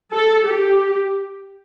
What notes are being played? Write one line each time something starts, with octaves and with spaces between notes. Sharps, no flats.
A4
G4